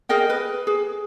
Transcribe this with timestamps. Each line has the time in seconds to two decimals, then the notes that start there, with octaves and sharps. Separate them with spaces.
0.09 G#4 A#4 D#5 G5
0.30 B4
0.67 G#4